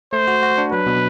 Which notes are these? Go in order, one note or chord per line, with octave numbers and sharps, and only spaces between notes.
A3 C5
F#4
F#4
D4
F#3 B4
B2